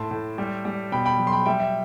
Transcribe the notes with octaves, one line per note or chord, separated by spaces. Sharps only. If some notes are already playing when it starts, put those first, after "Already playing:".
Already playing: A2 A5 C6
A2
G3
G3
B2 G5 B5
G5 B5
F#3
C6
G5 B5
G3 E5 G5
E5